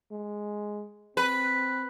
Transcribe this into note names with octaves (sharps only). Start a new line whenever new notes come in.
G#3
C4 B4